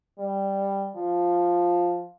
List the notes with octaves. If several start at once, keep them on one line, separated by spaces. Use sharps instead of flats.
G3
F3